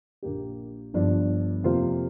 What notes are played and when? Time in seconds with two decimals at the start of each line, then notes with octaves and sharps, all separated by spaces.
0.22 A#1 A#2 A#3 G4
0.94 G1 G2 F3 D4
1.64 F2 C3 A#3 F4 C5